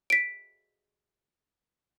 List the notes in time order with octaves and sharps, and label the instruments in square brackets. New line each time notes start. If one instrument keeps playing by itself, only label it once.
[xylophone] B6 D7